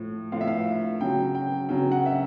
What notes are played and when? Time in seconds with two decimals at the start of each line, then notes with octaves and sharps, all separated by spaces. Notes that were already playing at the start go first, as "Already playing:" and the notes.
Already playing: A2 F3
0.32 A2 F3 F5
0.41 E5
0.47 F5
1.01 C#3 F#3 G5
1.35 G5
1.69 C#3 F#3 G5
1.92 F#5
2.06 E5